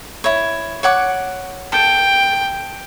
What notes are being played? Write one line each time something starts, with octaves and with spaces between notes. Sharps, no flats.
E4 C#5
C#5 F#5 D6
A4 G5